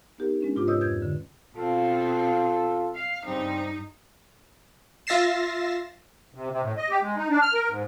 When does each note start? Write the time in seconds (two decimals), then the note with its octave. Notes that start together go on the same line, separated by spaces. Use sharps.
0.18 B3 D#4 G4 A#4
0.41 G#3 C#4 D4
0.56 G#2 C3 F4 G4 D6
0.67 B4 C#5 D#5 D#6 E6 G6
0.81 F2 G6 G#6
1.02 D3
1.56 B2 C4 F4 A4
2.95 F5
3.26 G2 C#3 G3 C4 D#4
5.07 F4 E5 A6 A#6 C7 E7
6.34 C3
6.51 C3
6.63 A2
6.77 D#5
6.89 G4
7.02 G#3
7.16 D#4
7.30 D4
7.41 F6
7.54 A#4
7.69 G#2